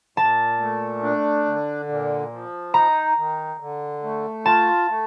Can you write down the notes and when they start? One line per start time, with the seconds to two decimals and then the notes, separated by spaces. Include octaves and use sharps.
0.17 A#2 A5
0.60 A3
1.03 D4
1.45 D3
1.89 A#2
2.32 F3
2.74 D#4 A#5
3.17 D#3
3.60 D3
4.03 A3
4.46 F4 A5
4.89 A3